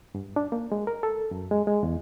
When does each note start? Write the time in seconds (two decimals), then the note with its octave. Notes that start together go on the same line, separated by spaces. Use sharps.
0.15 G2
0.36 D4
0.52 A#3
0.72 G#3
0.87 A#4
1.03 A4
1.31 F#2
1.51 G#3
1.67 G#3
1.83 E2